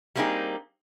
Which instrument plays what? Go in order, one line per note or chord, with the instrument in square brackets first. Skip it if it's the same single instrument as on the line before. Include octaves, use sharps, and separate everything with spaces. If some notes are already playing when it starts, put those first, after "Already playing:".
[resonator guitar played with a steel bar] G3 A3 A#3 C4 D#4 G#4